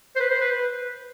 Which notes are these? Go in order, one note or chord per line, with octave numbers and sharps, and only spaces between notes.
C5
B4
C5
B4